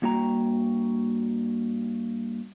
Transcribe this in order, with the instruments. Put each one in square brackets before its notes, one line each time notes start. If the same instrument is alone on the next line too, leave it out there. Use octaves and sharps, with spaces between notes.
[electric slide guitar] G2 A#3 F#4 G5 A#5